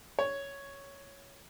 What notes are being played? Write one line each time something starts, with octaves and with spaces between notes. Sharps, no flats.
C#5